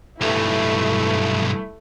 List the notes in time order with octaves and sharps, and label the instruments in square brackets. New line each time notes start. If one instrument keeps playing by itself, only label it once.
[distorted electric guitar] B1 G2 [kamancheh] A3 E4